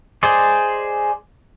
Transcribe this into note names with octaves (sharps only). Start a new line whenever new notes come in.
G#4 C5 D5 D#5